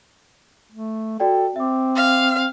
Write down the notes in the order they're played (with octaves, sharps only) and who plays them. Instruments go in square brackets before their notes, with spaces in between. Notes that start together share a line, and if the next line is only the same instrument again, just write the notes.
[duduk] A3
[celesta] F#4 D5 G5 [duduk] A4
[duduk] C4 [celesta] E5 D6
[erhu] F5